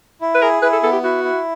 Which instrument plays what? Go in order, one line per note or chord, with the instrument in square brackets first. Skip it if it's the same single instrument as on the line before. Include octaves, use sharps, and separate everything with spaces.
[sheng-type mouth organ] E4
[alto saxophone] B4
[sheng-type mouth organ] G#4 [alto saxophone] A#4
[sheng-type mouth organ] E4 [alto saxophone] B4
[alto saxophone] A4
[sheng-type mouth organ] B3 [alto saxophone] A4
[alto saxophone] G4
[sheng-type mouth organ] E4 [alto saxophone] F#4
[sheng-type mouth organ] E4